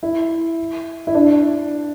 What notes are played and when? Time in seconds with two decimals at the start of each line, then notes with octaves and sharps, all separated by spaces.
0.03 E4
1.07 E4
1.15 D4